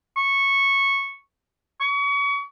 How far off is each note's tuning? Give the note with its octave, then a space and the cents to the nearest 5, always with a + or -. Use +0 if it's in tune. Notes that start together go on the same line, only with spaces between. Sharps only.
C#6 -10
C#6 +35